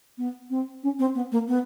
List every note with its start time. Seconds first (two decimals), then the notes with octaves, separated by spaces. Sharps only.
0.18 B3
0.50 C4
0.83 C#4
0.99 C4
1.15 B3
1.32 A#3
1.48 B3